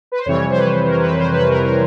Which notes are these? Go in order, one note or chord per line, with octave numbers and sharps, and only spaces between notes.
B4
C5
F2 C3 E3 G3 C#5
C5
B4
A#4
B4
C5
B4
A#4
A#4